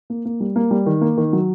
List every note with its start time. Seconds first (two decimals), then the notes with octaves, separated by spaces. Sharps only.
0.10 A#3
0.25 A#3
0.40 G3
0.56 A#3
0.71 G3
0.86 D#3
1.01 A#3
1.17 D#3
1.33 F#3